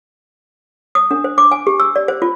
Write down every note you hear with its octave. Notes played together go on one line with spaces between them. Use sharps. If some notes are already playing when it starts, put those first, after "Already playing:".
D#6
D4
C5
D6
G#5
G4
E6
D5
C5
F4